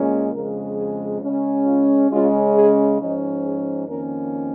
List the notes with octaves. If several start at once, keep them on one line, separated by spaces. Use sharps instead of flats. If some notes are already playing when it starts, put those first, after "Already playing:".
Already playing: A#2 G#3 C#4
F2 C#3 G#3 A#4
G#4
C#3 G#3 C#4
F4
C#3 G#3 C#4 F4
G#4
G#2 F3 C#4 D#4
G#4
F2 D#3 A#3 C#4 A#4